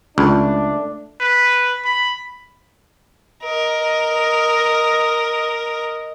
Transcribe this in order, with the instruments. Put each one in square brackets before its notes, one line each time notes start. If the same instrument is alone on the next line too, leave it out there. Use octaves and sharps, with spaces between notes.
[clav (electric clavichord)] C#2 [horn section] A3 D4
[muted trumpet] B4
B5
[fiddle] A#4 [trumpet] D#5